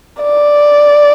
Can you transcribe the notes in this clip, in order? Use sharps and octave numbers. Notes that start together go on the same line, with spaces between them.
D5